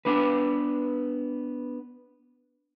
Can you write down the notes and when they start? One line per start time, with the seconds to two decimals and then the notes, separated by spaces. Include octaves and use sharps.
0.05 B3 D4 B4